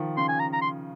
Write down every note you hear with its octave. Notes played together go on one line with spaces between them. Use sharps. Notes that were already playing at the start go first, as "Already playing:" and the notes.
Already playing: D#3 F3
C#3 C6
G#5
A#5
A#5
C6